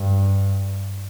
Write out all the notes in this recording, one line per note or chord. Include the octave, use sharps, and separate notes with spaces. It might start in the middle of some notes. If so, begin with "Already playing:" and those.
Already playing: G2